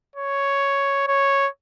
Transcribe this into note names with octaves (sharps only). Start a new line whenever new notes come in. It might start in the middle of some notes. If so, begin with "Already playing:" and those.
C#5
C#5